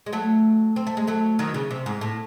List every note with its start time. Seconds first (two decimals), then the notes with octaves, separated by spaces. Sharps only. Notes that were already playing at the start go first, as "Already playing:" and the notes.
0.06 G#3
0.13 F#3 A3
0.76 C4
0.87 A3
0.97 G#3
1.07 F#3 A3
1.39 D#3 F#3
1.54 C#3
1.71 C3
1.86 G#2
2.01 A2